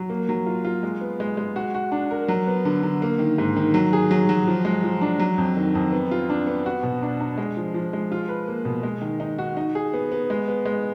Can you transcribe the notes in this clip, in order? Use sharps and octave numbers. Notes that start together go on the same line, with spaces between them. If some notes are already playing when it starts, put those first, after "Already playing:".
Already playing: F#3
A#3
F#3
F4
F4
G#3
B3
G#3
G#3
F#4
F#4
D4
A#4
F#3
B3
D3
D3
A#3
D#3
G#2
D#3
F#3
G#4
F#3
F#3
F3
G#3
F3
D4
F#3
F2
D#3
F2
B3
F4
D4
B3
F#4
B2
D4
D4
G#3
F3
F3
G#3
F4
B4
A#3
B2
G#3
D#3
D#4
F#4
D#4
G#4
B3
B3
G#3
B3
G#3